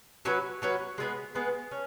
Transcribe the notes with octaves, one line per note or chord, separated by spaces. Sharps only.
F#3 C#4 F#4 B4
F#3 C#4 F#4 B4
G#3 B3 G#4 B4
G#3 B3 G#4 B4
C#4